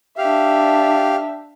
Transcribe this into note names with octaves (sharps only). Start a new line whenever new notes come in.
D4 G4 E5 F5